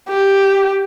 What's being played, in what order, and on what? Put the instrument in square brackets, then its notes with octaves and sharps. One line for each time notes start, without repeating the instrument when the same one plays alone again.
[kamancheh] G4